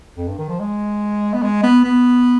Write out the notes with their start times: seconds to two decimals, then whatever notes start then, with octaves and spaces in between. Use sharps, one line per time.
0.17 F2
0.29 G2
0.39 D#3
0.49 F3
0.60 G#3
1.34 B3
1.43 G#3
1.63 B3
1.84 B3